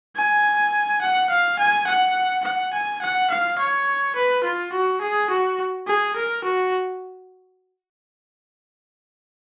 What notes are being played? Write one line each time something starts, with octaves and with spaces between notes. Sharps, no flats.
G#5
F#5
F5
G#5
F#5
F#5
G#5
F#5
F5
C#5
B4
F4
F#4
G#4
F#4
G#4
A#4
F#4